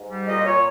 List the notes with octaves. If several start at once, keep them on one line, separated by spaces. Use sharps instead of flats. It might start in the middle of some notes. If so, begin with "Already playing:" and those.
Already playing: G#2
G3
A#2 D#5
A#2 C#5